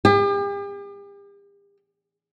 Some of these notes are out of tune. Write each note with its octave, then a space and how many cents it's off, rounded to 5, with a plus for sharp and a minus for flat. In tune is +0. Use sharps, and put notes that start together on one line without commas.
G4 +40